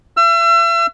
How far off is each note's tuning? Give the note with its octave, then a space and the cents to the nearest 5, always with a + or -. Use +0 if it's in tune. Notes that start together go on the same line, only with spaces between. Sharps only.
E5 +40 E6 +40